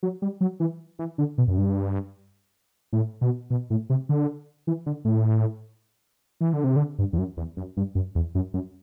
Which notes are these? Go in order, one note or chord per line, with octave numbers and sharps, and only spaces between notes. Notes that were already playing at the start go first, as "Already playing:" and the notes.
F#3
G3
F#3
E3
E3
D3
B2
F#2
G2
A2
B2
B2
A2
C3
D3
E3
D3
A2
E3
D3
C3
D3
G2
E2
F#2
E2
F#2
G2
F#2
E2
F#2
F#2